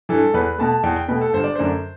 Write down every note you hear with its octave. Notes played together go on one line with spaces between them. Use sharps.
G2 E3 A4
E2 B4
B2 A3 A5
E2 G5
G5
B2 A3 B4
A4
G1 C5
D5
F#2 D3 A3 D4 C5